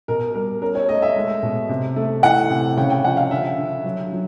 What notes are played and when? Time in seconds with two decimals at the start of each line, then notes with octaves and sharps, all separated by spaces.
0.08 B2 A#4
0.35 G3 A#4
0.62 C#4 A#4
0.75 C#5
0.88 A3 D#5
1.02 E5
1.16 G#3
1.43 B2
1.69 C3
1.96 A3
2.23 E3 F#5
2.50 C3
2.77 C#3 G5
2.90 G5
3.04 F3 F#5
3.17 F5
3.31 D3 E5
3.58 D3
3.84 F#3
4.12 F#3